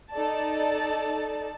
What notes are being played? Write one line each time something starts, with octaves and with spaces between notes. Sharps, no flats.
D#4 A4 D5 A5